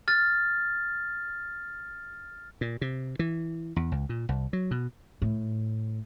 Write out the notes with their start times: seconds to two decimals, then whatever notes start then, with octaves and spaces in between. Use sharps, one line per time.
0.08 F6 A6
2.61 A#2
2.81 C3
3.19 E3
3.76 E2
3.92 C#2
4.09 A#2
4.29 C2
4.53 F#3
4.71 B2
5.22 A2